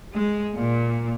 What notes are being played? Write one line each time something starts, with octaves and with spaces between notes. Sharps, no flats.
G#3
A#2